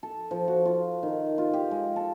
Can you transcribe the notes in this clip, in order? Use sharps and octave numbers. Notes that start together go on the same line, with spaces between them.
A4
F3
F#4
F4
D#3
F4
G4
G#3
A4